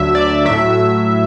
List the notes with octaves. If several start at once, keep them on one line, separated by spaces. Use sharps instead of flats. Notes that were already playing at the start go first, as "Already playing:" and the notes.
Already playing: D2 D3 F#3 E5
D5
A2 F#3 E5